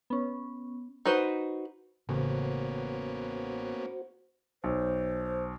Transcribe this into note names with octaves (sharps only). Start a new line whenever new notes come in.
B3 C#4
D#4 F#4 B4 C5
A1 C#3 A#3 B3 C#4 F#4 C5
B1 C5